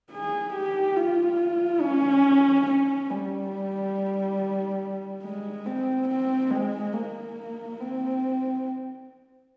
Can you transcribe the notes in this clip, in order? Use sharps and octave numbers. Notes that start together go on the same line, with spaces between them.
G#4
G4
F4
C#4
C#4
G3
G#3
C4
C4
G#3
A#3
C4